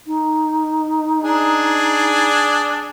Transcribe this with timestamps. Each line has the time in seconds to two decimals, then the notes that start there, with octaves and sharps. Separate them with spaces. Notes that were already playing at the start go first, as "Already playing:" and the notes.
0.07 D#4
1.23 D4 G#4